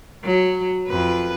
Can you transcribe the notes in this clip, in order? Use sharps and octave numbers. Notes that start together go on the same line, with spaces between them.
F#3
F2 B4